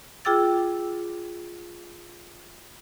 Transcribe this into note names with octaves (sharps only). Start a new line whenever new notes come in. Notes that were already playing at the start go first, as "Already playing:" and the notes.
F4 G#4 G5 D6 E6 A6